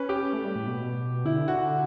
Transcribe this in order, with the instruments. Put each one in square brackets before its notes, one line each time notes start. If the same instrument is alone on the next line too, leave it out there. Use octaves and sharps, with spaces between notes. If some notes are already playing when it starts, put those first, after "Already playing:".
Already playing: [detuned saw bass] C#4 [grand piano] B4
[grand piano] G4
[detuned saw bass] A3
G3
A2
B2
[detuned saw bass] D3 [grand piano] E4
[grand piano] F#4